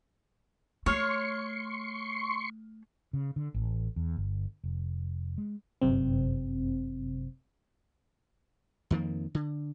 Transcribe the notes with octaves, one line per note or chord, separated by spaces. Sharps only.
A3 C#5 C6 C#6 F6
C#3
D3
A1
E2
G1
F1
G#3
G1 F#2 C3 C4
F2 D#3 F3 A#3
D3